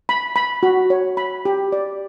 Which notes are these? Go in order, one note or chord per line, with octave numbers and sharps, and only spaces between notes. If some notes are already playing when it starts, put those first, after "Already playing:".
B5
B5
F#4
C#5
B5
G4
D5